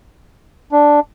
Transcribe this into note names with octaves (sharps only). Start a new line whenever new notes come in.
D4